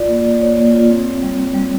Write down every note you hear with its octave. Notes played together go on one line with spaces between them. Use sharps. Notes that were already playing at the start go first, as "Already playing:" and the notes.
Already playing: F4 D5
A#3
A#3
D5
A#3 C#5
A#3
F4
C4
C4
G3
C4
G3